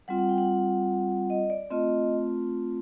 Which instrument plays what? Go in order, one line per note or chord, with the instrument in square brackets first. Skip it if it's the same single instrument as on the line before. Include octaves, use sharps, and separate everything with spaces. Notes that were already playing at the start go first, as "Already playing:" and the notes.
[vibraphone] G3 C4 F4 F#5
F#5
G5
F#5
D#5
D5
A3 C4 F4 D#5